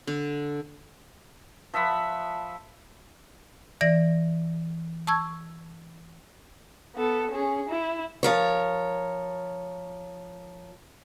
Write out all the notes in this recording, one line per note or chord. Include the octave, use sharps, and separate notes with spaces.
D3
F3 E5 F#5 B5
E3 D5 A#6
A5 C#6 E6 G#6
B3 A4
C#4 G#4
E4
F3 A#4 C#5